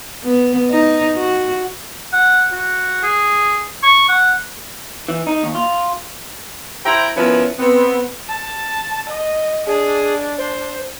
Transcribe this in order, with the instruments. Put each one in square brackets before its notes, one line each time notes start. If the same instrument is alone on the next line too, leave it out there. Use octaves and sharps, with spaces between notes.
[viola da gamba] B3
D#4
F#4
[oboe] F#5
F#4
G#4
C#6
F#5
[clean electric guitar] E3
D#4
D#2
F4
[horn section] E4 C5 E5 G5 A#5
F3 B3 C#4 E4 A#4 B4
B3 C4
[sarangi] A5
D#5
[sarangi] D4 [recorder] G#4
[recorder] C5